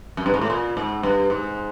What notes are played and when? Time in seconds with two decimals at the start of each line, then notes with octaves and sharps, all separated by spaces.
0.17 F#2
0.26 G2
0.34 G#2
0.41 A2
0.50 A#2
0.77 G#2
1.03 G2
1.30 G#2